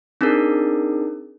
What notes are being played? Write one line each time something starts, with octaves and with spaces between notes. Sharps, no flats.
C4 D4 D#4 G#4 A#4